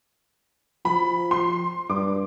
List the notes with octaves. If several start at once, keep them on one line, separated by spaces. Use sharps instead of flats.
F3 B5
C6
G2 D6